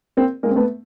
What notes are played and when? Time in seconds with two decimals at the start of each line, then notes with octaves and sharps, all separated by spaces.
0.17 A#3 C4
0.43 G#3 A#3
0.51 C4
0.56 A3 B3